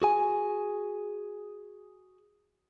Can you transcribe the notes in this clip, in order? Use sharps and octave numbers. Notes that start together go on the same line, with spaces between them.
F#4 G#4 G#5